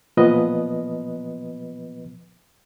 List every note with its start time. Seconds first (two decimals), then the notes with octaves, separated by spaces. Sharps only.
0.17 A#2 F3 B3 B4 D#5